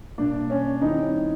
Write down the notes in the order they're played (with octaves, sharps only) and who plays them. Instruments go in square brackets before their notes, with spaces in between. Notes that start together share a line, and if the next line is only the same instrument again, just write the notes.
[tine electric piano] B2 G3 A#3 [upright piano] D4
[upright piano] C#4
[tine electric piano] D#3 G3 C4 E4 [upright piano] D#4